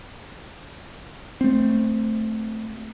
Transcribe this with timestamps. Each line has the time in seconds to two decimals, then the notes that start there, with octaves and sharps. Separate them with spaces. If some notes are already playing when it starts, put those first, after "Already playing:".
1.41 A3 C4